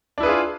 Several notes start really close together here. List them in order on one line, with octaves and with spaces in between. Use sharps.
D4 E4 B4 G#4 F4